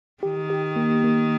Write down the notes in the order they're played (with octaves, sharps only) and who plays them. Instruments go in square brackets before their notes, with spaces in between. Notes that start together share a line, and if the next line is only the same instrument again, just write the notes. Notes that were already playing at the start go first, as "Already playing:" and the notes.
[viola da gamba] D#3 [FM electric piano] G4
[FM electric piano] G4
A#3
A#3